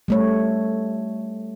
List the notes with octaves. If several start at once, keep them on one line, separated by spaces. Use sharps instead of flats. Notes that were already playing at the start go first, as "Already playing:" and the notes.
G3 A3 C#5